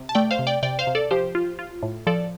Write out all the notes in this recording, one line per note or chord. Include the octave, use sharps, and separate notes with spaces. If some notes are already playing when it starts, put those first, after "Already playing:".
Already playing: C3
A5
A3 D5 G5
C5 F5
C3
D5 G5
C3 D5 G5
C5 F5
C3
A4 D5
F3 G4 C5
F4
F4
A2
F3 A4 D5